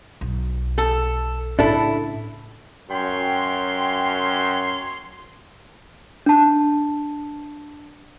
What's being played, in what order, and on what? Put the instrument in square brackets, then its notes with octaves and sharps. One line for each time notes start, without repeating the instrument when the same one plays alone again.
[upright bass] B1
[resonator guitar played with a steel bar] A4
[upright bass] A2 C#3 [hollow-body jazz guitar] D4 A4 [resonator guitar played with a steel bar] E4
[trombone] F#2 [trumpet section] C#5 C6 [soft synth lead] G5
[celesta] D4 A5